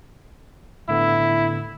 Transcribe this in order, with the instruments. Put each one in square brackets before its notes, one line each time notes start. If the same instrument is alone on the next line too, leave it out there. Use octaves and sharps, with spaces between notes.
[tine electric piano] A2 D3 B3 [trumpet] E4